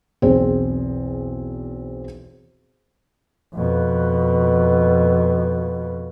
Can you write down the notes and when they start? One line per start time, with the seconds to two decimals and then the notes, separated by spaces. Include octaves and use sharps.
0.22 B1 E2 C4 G#4 C5
3.54 F2 B2